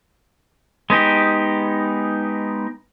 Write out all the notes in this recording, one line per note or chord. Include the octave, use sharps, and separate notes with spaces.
G#3 B3 D#4 G4